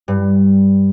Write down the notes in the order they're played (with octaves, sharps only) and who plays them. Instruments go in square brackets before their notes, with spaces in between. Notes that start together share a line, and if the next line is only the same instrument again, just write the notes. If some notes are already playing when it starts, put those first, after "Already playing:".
[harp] G2